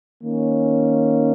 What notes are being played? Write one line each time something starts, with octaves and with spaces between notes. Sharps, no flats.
D#3 A#3 C#4